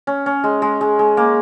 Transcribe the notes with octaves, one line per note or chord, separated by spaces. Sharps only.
C#4
C#4
G#3
G#3
G#3
G#3
A#3